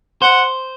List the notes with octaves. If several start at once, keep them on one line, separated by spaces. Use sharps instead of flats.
C5 F#5